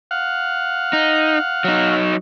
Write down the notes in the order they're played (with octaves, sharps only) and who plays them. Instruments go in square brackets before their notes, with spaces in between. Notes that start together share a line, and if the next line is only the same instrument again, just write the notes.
[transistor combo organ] F5 F#5
[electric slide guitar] D#4
F#3 D#4